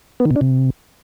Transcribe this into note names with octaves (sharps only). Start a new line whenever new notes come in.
B3
D#3
B2
D4
C3